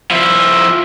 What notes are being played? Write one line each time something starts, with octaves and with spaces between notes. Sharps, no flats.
F3 E4